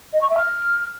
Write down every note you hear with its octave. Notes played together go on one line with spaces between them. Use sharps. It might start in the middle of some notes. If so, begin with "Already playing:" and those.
D#5
C#6
E5
F6